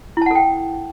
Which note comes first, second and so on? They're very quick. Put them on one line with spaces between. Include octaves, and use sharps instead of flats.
E4 A5 F#5 A4 G5